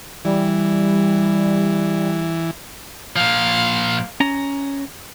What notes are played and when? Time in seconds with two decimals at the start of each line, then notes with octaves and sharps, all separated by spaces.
0.25 E3 G3
3.16 A#2 F3 F5
4.20 C#4 A#5